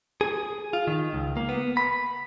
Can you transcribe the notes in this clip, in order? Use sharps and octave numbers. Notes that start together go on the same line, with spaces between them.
G#4
F4
D#3
C#2
A#3
B3
B5